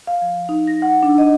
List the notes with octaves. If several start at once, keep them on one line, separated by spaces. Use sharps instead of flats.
F5
F3
D#4
A#6
F#5
D4
D#5